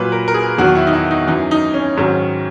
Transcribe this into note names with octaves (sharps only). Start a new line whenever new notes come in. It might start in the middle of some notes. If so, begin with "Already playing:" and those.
Already playing: A#2 F#3 B4
A#4
A#4
G#4
E2 D#3 F#3 F#4
E4
D#4
E4
D#4
F#2 E3 D#4
D#4
C#4
G#2 D#3 F#3 C#4